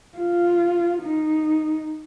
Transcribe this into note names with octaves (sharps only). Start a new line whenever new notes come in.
F4
D#4